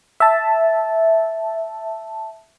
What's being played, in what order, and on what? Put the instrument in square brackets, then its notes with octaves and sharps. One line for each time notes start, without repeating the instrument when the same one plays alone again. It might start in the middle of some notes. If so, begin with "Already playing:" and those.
[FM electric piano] E5 A5